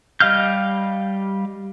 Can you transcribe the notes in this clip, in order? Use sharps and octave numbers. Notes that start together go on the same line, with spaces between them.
G3 D#5 F5 F6 G6